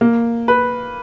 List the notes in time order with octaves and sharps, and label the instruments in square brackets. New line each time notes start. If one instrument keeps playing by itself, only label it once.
[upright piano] A#3
B4